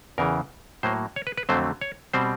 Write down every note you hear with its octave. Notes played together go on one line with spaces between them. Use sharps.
E2 C#3 E3 A#4
A2 F#3 A#3 C5
C#5
B4
B4
F2 D3 F#3 A3 C4 C5
C#5
B2 G3 C4 C5